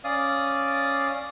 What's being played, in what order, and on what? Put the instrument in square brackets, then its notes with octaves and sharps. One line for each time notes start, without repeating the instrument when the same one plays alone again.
[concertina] C#4 D5 F5 D#6